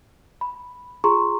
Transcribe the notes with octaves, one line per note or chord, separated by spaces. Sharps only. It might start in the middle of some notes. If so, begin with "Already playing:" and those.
B5
F4 G#4 A#5 C6 C#6